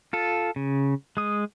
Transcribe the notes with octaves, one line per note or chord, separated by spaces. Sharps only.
F4 A4
C#3
G#3 D#6